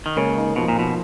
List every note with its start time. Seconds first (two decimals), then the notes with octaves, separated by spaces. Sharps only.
0.06 D#3
0.17 C#2 C#3 A#3
0.37 D#4
0.56 B2 F3
0.68 A#2
0.76 B2 F3